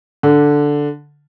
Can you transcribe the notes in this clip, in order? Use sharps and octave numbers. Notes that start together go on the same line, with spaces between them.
D3